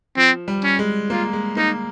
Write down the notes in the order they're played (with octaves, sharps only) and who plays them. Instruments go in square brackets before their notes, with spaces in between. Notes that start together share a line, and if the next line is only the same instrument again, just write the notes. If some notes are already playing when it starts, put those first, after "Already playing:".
[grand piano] F3 [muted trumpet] C4
[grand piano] G3
[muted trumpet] C#4
[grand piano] G#3
[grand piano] A#3 [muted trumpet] F4
[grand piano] G#3
[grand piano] A#3 [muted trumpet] D#4